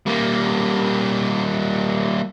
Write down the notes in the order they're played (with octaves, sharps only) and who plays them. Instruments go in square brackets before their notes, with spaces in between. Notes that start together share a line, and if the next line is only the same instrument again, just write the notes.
[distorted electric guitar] G3 A#3